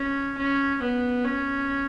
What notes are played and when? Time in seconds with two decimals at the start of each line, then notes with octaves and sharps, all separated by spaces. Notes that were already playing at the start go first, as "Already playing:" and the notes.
Already playing: C#4
0.38 C#4
0.82 B3
1.25 C#4